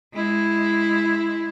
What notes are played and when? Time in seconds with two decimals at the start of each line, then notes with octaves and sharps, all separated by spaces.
0.14 G#3 E4